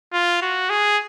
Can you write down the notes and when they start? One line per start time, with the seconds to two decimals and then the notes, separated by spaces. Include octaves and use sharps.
0.13 F4
0.42 F#4
0.70 G#4